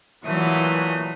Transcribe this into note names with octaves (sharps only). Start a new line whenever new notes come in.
A#2 E3 F#3 A3 B3 D#6